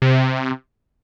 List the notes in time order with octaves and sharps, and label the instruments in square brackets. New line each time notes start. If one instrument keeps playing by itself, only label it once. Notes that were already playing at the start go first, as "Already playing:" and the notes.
[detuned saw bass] C3